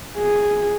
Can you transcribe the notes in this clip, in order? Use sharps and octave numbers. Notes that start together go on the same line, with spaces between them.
G#4